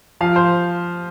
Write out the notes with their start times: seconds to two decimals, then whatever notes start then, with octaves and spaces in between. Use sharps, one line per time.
0.21 F3 F5
0.36 C5